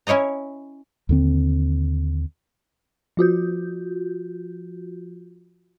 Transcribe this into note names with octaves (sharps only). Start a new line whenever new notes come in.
C#4 E4 C#5 D#5 A#5
D#2 D3 C4
F3 F4 F#4 G6